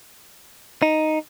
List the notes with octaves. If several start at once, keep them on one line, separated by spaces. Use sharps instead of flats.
D#4